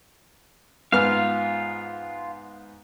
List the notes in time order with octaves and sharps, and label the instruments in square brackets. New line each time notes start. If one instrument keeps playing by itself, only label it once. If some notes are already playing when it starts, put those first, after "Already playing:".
[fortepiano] G#2 B3 F6 [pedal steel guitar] F4 F5